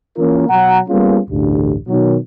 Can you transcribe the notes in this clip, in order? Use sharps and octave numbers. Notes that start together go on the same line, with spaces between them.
E3 A#3 C#4 F4 A#4
B2 F#3 F#5 A#5
G3 A#3 B3 C#4 F4 G#4
A1 D2 G2
B2 D#3 F#3